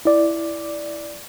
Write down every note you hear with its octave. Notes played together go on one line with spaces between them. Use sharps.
E4 D5